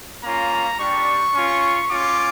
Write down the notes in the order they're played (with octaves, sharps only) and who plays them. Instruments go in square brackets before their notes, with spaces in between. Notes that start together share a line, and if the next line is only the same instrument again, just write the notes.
[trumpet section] A#3 C#4 F4 A#5
G3 D4 G4 C#6
C#4 F4
C#4 F4 D6